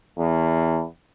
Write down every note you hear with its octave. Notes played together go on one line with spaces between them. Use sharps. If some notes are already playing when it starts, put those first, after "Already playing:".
E2